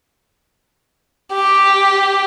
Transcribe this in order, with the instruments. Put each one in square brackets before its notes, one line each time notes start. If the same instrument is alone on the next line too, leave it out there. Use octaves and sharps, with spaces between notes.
[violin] G4